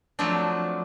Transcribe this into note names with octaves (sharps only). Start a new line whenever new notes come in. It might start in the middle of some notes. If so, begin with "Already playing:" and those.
F3 F#3 A3 C4 D4